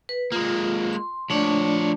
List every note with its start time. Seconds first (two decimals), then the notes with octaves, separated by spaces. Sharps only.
0.09 B4
0.32 G#3 A#3 F4
0.93 C6
1.30 F3 A3 D4 C#5 D5